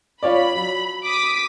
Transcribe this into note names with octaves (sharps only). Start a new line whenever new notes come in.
F4 C#5 D5 B5
F#3
D6 D#6 B6